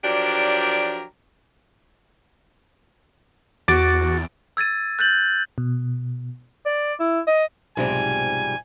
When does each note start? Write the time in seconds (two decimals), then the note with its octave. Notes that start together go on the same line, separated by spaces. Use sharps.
0.04 F3 F#3 D4 G4 A#4 D5
3.68 E2 F#4 D6 A6 D7
4.57 E6 G#6 A6 D#7
4.99 F#6 G6 A6 F#7
5.58 B2
6.66 D5
7.00 E4
7.27 D#5
7.77 B1 G#2 C3 F3 G3 G#5